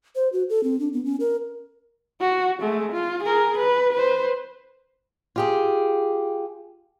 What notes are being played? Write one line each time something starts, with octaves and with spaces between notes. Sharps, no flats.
C5
F#4
A4
C4
D4
B3
C#4
A#4
F#4
G#3 A3
F4
G#4 A#4
B4
B4 C5
F4 G4 G#4